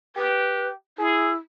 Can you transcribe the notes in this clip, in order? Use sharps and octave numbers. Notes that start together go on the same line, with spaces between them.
G4 B4
E4 G#4